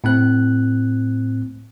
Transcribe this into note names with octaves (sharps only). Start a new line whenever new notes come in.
A2 C4 F#6